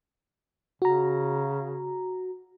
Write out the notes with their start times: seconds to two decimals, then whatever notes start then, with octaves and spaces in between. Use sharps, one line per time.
0.82 C#3 F#4 A#5